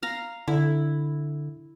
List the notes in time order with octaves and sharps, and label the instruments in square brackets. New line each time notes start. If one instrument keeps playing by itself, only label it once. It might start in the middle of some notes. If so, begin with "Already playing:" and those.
[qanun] F5 A#5
[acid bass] D3 [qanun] E4